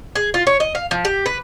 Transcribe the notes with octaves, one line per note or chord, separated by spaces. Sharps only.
G#4
F4
C#5
D#5
F5
F3
G4
B4